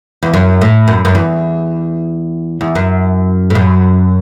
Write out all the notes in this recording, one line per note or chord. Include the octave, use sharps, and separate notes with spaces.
E2
F#2
A2
F#2
F#2
E2
E2
F#2
A2
F#2